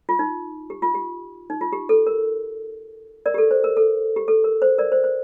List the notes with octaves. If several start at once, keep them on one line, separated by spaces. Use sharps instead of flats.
F4
D#4
G4
F4
G4
D#4
F4
G4
A4
A#4
A#4 D5
G4
A4
C5
A#4
A4
G4
A4
A#4
C5
A#4 D5
C5
C5